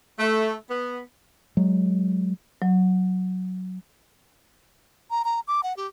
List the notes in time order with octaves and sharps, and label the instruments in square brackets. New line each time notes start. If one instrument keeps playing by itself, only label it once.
[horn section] A3
B3
[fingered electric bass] F#3 G#3
[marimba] F#3
[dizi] A#5
A#5
D6
F#5
G4